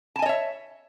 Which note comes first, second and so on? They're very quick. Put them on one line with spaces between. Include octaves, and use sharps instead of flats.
A5 G#5 D#5 C#5 E5